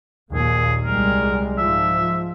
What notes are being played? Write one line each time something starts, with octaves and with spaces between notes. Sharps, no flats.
A#1 D#2 A#2 G#4
C2 G3 G#3 A#4
G#2 F3 E5